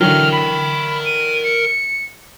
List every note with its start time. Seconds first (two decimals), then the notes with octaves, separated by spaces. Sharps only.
0.01 D3 E3 F#3 A#4 G5 F6
0.32 B5
1.05 D#7
1.44 C#7